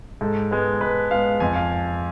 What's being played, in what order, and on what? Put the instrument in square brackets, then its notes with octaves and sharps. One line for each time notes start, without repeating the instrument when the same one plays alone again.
[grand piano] G#2 A4
G#3 B3
G#2 B4
G#3 B3 F5
F2 G#5
F5